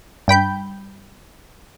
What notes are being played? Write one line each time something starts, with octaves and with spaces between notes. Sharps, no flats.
G2 G5 B5 G6